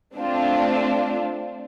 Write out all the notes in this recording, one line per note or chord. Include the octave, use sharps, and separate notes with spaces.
A3 C4 D4 F4